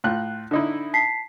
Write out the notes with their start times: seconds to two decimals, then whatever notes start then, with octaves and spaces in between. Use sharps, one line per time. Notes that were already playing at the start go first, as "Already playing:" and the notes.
0.04 A2 F4 F#6
0.51 D3 D#4 E4
0.94 A5 B6 C7